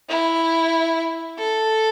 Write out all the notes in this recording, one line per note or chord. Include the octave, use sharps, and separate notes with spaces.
E4
A4